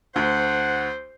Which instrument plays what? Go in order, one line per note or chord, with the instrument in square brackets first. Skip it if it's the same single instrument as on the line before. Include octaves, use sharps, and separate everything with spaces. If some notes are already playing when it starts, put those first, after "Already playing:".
[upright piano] D2 [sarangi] C5 [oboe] F#5